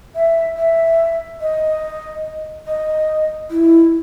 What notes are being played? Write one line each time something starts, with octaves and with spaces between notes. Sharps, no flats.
E5
E5
D#5
D#5
E4